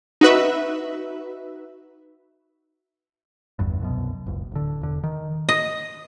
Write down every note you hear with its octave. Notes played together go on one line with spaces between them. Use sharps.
D#4 F#4 B4 E5
G1 E2 G2
C2 F#2 B2
F#1 C#2
D1 D3
E1 D3
D#3
D#5